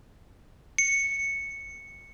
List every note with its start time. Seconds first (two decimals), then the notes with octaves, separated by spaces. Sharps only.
0.78 C#7